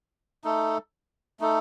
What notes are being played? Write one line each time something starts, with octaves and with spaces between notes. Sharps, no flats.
A3 D#4 A4
A3 D#4 A4